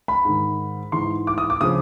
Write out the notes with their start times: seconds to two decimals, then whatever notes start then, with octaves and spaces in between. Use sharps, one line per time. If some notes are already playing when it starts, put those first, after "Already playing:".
0.08 B5
0.25 G#2 D#3
0.92 G#2 E3 C6
1.27 D6
1.38 D#6
1.50 D6
1.61 C#3 F3 D#6